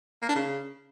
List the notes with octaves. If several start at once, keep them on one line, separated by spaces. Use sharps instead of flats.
A#3
D4
C#3